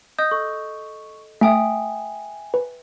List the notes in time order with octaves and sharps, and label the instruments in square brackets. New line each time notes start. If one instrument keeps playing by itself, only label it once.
[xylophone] D#5 D#6 G6
[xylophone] A4 [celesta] C#6
[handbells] A3 [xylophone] E5 G5 D#6 [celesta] G#5
[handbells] B4